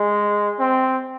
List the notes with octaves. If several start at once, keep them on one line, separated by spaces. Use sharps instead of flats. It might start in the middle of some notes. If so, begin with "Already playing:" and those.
Already playing: G#3
C4